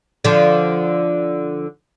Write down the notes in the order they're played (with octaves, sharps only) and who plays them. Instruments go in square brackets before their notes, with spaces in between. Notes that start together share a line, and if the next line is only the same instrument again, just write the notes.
[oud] D3 F3